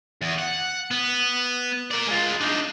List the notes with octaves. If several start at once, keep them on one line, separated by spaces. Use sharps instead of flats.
E2
F#5
B3
A#4 D5
G#3 F4
D4 D#4